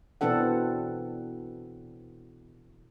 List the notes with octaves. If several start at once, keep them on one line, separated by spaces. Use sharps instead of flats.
B2 E3 C4 D4 A4 F#5